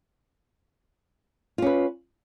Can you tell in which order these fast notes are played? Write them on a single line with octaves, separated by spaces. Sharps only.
F4 C#4 B4